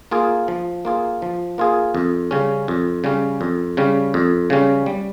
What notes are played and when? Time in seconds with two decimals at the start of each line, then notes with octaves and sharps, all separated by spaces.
0.11 A#3 F4 G#4
0.48 F3
0.85 A#3 F4 G#4
1.22 F3
1.58 A#3 F4 G#4
1.94 F2
2.31 C#3 G3 C#4
2.68 F2
3.04 C#3 G3 C#4
3.41 F2
3.77 C#3 G3 C#4
4.14 F2
4.50 C#3 G3 C#4
4.86 G3